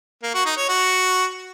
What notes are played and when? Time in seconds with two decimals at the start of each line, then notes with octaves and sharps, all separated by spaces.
0.23 A#3
0.34 F#4
0.46 D#4
0.57 C#5
0.69 F#4